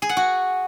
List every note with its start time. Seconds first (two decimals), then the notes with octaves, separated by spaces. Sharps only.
0.02 G#4
0.09 F#5
0.17 F#4